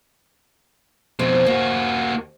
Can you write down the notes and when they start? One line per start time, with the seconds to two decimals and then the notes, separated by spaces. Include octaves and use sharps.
1.19 F2 B2 C4
1.46 D#2 A#3 F#4